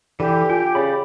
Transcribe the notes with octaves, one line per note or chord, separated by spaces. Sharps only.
D3 E3 G4
F4 G5 G#5
C#3 G4 D5 B5